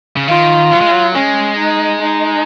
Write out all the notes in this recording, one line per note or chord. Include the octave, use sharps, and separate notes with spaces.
C#3
D#3 F4
F#3
G#3
F#3
G#3 C#4
D#4
D#4